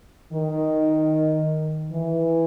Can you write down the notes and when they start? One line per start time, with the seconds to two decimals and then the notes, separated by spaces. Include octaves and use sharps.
0.33 D#3
1.93 E3